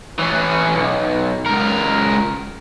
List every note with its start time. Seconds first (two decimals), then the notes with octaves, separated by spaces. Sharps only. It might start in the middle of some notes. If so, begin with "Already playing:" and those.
0.19 E3 C#4
0.75 B1
1.46 C#2 A#4